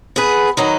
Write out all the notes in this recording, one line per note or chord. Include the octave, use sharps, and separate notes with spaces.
B3 G#4 B4
D#3 F#3 D#4 B4